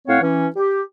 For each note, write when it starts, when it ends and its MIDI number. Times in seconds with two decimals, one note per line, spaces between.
0.08 0.21 45
0.08 0.21 60
0.08 0.21 73
0.08 0.21 77
0.08 0.21 78
0.22 0.48 52
0.22 0.48 61
0.56 0.82 67